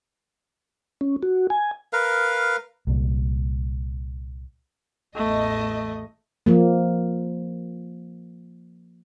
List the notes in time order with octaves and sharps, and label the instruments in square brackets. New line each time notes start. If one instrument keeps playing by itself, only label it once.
[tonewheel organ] C#4
F#4
G#5
[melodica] A#4 B4 F5
[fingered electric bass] C2 A#2
[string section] A1 E2 D#5 [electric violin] A3
[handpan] F3 A#3